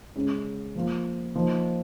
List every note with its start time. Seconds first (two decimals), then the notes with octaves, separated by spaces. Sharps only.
0.16 C#3 G#3 C#4
0.75 F3 A#3 F4
1.35 F3 A#3 D#4